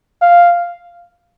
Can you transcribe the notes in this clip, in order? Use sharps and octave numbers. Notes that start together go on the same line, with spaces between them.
F5